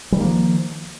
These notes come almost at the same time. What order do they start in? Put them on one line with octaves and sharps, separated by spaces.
G3 D#3 A#3 F3